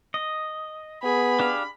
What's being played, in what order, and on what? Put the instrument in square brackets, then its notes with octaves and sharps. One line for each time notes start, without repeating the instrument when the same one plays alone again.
[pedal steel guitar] D#5
[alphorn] B3 [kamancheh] G#4 [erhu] B5
[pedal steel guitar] D4 G4 F5